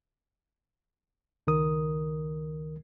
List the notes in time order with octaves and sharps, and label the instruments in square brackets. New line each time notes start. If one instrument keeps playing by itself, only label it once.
[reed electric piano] C#2 D#3 A#4 D#6